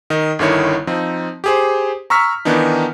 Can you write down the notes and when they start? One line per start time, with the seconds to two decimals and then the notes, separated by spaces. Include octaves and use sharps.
0.10 D#3 D#5
0.39 G1 D3 D#3 E4 C#5
0.87 F3 C4 D#4
1.44 G4 G#4 C5
2.10 A#5 C#6 E6 F6 B6
2.45 D#3 E3 B3 D4 D#4